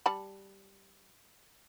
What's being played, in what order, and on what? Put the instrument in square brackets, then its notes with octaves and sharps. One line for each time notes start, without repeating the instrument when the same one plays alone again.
[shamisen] G3 A5 B5